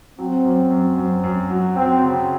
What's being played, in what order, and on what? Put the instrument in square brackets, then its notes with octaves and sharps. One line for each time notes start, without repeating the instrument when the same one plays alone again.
[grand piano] F#3 [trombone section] C4
[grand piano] F#2
F#2
F#2
F#2
F#3
[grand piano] F#3 [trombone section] C4
[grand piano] C#3